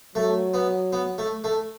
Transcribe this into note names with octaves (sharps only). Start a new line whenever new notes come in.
F#3 A3
B3
B3
A3
A3